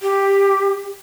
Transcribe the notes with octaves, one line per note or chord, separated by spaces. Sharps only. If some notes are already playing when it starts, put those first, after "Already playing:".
G4